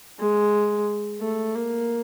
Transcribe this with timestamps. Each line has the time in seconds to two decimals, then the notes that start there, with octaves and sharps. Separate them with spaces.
0.20 G#3
1.21 A3
1.55 A#3